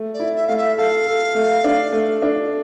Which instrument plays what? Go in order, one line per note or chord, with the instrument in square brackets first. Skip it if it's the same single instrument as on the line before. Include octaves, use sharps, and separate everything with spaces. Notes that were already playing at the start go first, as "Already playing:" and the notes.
Already playing: [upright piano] A3
[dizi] D5
[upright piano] E4
[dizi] E5
[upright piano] A3 [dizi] F5
[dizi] E5
[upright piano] A4 [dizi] F5
[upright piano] A4
A3
D4
A3
D4